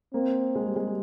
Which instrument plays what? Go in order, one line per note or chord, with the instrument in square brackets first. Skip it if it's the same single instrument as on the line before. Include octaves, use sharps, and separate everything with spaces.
[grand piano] A#3 [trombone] C4
[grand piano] G#3
G3
G#3
G3